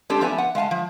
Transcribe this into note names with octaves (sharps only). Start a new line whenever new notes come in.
G#3 C4 D4 G4 A4
F3 A3 B3 B4 E5 G#5
F#5
G#3 F5 G#5 A5
F3